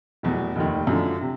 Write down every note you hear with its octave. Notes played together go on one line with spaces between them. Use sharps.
F1 E2 B2 F#3
F1 D#2 D#3
F#2 D3 F3 A3 D4
C3